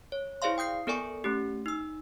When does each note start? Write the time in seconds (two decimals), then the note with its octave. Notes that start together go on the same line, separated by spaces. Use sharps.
0.12 C#5
0.42 E4 G#4 C5 D5 F5 C6
0.58 G5 D#6 G6 C7
0.87 B3 A4 A#4 D5 G#5 C#6
1.24 A3 C#4 G4
1.66 D#4 E6